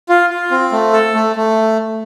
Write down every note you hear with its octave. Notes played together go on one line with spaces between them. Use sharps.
F4
F4
C4
A3
A4
A3
A3